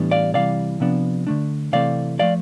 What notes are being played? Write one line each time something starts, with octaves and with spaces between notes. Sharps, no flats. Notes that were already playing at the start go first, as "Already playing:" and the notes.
Already playing: A2 E3 G3 B3 D4
D5 F5
C3 E3 G3 D5 F5
C3 F3 B3 D4
D3 A3 D4
C3 E3 A3 C4 D5 F5
A2 F3 A3 D5 F5